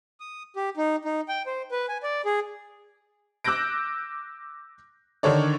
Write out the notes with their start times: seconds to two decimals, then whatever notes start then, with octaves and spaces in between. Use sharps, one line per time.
0.20 D#6
0.56 G4
0.77 D#4
1.05 D#4
1.28 G5
1.46 C5
1.71 B4
1.89 G#5
2.03 D5
2.25 G#4
3.44 D6 E6 F#6 G6 A#6 D7
5.23 D3 D#3 A4 C#5 D5